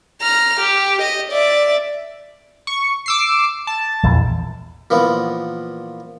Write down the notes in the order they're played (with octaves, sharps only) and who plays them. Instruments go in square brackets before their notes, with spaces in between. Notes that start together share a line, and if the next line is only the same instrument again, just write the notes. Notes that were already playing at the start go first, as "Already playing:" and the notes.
[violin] A#5 F6
G4
D#5
D5 E5
[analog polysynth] C#6
D6 E6 C7
A5
[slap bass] A#1 E2 E3
[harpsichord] A#2 E3 F3 B3